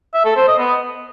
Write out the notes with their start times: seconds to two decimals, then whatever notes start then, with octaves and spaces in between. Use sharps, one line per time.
0.14 E5
0.25 A4
0.36 C5
0.48 D#5
0.59 B3